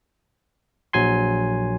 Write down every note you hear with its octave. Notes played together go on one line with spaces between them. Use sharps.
A#1 F#3 G#5 C6